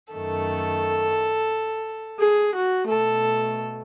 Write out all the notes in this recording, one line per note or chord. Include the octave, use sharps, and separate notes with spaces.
F#2 D#3 A3 A4
G#4
F#4
B2 A3 A4